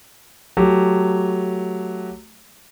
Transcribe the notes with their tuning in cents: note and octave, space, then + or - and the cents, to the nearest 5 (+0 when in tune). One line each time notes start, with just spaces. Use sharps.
F#3 +0 A3 +0 G4 -5